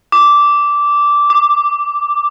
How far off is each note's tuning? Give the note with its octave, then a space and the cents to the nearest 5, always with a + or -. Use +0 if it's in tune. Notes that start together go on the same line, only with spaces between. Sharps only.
D6 -10
D6 +10